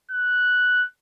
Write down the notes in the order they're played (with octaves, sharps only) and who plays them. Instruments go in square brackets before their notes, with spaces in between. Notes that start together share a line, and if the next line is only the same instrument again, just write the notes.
[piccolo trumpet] F#6